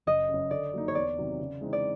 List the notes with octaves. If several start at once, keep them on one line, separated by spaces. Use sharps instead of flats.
F#1 D#5
F#2 C#3
D3 D5
F#3 A#3 D#4
C#5
E2 D5
C3 D#3 F#3
C#3
E3 G#3 C4 D#4
D5